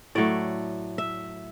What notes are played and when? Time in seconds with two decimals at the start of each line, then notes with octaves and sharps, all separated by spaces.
0.15 A2 F#3 A3 D5
0.98 E5